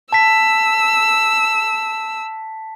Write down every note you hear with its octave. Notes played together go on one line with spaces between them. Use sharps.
A5 E6 B6